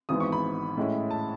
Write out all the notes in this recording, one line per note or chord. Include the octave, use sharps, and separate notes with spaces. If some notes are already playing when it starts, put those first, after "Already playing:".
G#1 G#2 E3 B3 D#6
C#6
B5
A2 G#3 C#4 E4
A5